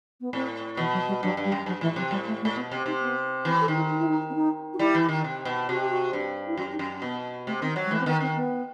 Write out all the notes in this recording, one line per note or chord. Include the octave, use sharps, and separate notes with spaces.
B3
A2 C4
B2 E3
F#3
G3
G2 F#3
G2
G3
F#2
G2 F#3
A2 E3
C3 F#3
A2 G3
A3
A3
A2
B2 B3
C3 C4
C3 D#4
B3
E3 C4
A4
D#3 D#4
E4
D#4
E4
D#4
C4
D#4
F#4
G3 E4
E3
D#3
C3
B2
C3 F#4
G4
F#4
G2
E4
F#2 F#4
D#4
F#2
B2 B3
C3 A3
D#3 C4
F#3
G3
E3 A3
C4
D#3 B3
D#3 C4
B3